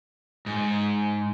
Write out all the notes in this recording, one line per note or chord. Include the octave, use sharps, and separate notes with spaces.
G#2